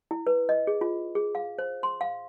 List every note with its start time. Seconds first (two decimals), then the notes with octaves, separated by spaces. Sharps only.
0.11 E4
0.27 B4
0.49 D#5
0.67 G#4
0.81 F4
1.15 G#4
1.35 F5
1.59 C5
1.83 C6
2.01 F5